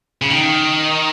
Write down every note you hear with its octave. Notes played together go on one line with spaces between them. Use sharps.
C#3
D#3